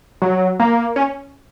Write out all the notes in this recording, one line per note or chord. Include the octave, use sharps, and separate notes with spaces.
F#3
A#3
C#4